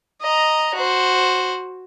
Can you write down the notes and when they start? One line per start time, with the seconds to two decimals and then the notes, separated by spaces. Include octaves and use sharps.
0.21 D#5 A#5
0.74 F#4 C5